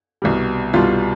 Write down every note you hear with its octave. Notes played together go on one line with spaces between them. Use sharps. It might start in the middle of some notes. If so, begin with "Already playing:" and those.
C2 B2 G3
C2 B2 G3 F4